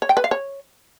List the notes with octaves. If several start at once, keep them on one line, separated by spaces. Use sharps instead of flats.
C#5
G5
B4
F5
C#5